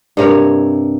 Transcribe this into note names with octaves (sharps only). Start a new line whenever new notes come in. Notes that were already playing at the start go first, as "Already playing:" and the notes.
G2 C3 A#4 C#5